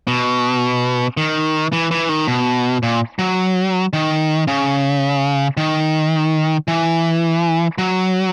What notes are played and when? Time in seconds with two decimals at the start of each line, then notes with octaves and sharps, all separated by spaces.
0.07 B2
1.17 D#3
1.73 E3
1.91 E3
2.09 D#3
2.28 B2
2.83 A#2
3.19 F#3
3.93 D#3
4.47 C#3
5.57 D#3
6.68 E3
7.78 F#3